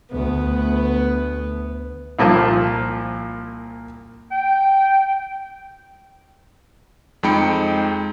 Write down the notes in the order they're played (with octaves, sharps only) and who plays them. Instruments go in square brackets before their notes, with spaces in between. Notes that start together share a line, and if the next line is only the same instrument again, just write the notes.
[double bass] D2 A3 [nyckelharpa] B3
[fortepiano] C2 A#2 F3 A#3 A5
[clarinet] G5
[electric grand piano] F2 G#3 D#4 G5 B5 C#7